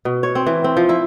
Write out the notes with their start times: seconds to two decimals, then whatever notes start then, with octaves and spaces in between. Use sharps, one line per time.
0.05 B2
0.23 C#5
0.35 C4
0.47 E3
0.64 C4
0.77 F3
0.89 E4